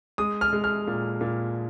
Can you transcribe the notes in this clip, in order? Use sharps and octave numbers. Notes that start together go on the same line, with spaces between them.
G#3 D#6
F6
G#3
F6
A#2
A#2